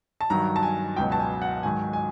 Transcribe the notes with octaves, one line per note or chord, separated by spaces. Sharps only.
A5
G2 D#3 F#3 A#5
A5
G#5
C#2 B2 F#3 G5
A5
G#5
F#5
G#2 D#3 F#3 G#5
G#5